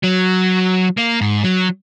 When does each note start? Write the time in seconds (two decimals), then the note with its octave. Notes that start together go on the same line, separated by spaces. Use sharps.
0.03 F#3
0.97 A#3
1.21 G#2
1.44 F#3